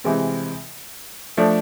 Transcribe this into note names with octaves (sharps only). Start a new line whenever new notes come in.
C3 E3 G#3 C4
F3 A3 D4